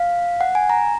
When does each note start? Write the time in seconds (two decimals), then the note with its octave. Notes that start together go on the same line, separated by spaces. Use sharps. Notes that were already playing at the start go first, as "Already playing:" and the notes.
Already playing: F5
0.41 F#5
0.55 G#5
0.70 A#5